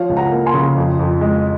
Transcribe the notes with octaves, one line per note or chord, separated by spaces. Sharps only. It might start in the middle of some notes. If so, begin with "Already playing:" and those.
Already playing: F3 C#5 F5
C#2
F#5 A#5
A#3
G#5 C6
C#3
F2
F2
G#3